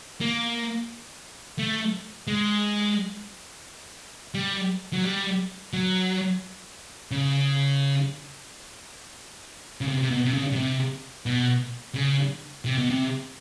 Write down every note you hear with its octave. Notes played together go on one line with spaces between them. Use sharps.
A#3
A3
G#3
G3
F#3
G3
F#3
C#3
C#3
C3
C3
B2
C3
C#3
B2
C3
B2
C#3
C3
B2
C3